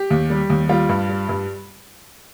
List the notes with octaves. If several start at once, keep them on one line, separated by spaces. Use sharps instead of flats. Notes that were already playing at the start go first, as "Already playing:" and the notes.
Already playing: G4
D#2
G3
D#2
G3 F4
G2
G3
G2